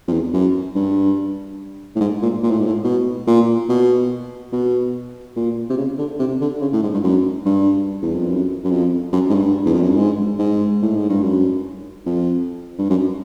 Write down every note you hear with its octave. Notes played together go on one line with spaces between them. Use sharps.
F2
E2
F#2
G2
A2
G#2
A#2
A#2
A2
G#2
A2
B2
A#2
B2
B2
A#2
C3
C#3
D3
C3
D3
C#3
A2
G#2
G2
F#2
G2
E2
F2
F#2
F#2
F2
F#2
G#2
G2
E2
F2
F#2
G2
G#2
G#2
A2
G#2
G2
F#2
F2
G2
F#2